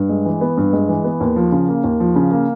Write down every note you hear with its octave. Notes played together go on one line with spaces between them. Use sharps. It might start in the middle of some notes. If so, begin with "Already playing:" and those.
Already playing: G2
G#3
E3
B3
G2
G#3
E3
B3
D#2
F3
C#3
A#3
D#2
F3
C#3
A#3